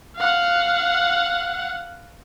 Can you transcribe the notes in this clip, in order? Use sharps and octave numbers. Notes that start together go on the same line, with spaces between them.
F5 F#5